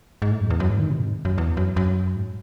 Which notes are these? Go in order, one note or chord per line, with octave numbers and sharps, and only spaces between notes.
G#2
A2
F#2
E2
F#2
G#2
D#3
C3
G#2
F#2
E2
F#2
F#2
G#2